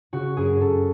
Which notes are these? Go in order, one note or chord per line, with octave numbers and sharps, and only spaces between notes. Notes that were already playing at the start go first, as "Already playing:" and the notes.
C#3 F#4
F#2 G#4
F#2 A4